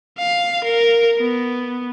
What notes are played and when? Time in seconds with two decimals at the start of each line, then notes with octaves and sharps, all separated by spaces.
0.18 F5
0.64 A#4
1.18 B3